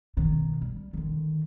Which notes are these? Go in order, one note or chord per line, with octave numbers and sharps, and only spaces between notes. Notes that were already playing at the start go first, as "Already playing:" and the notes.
B2 D#3
G3
D3 D#3